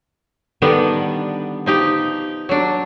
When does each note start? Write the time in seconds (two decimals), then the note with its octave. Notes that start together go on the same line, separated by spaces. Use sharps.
0.62 D3 D#3 G3 B3 D4
1.66 F3 D#4 G4
2.49 F#3 D4